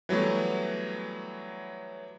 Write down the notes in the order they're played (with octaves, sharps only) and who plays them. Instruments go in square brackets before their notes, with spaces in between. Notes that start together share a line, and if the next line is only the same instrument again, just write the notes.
[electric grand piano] E3 F#3 G3 A3 B3